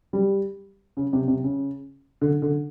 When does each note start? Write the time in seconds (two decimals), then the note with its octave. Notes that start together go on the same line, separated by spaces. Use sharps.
0.13 G3
0.97 C#3
1.13 C3
1.28 C3
1.44 C#3
2.21 D3
2.42 D3